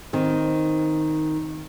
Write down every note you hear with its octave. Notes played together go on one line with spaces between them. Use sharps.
D#3 C4